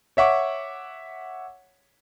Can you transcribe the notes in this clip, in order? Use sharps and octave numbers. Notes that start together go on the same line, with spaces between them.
C#5 E5 F#5 C#6 D6